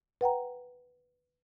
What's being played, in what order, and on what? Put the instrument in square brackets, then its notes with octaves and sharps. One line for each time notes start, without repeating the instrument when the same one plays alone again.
[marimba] B4 F#5 G5 A#5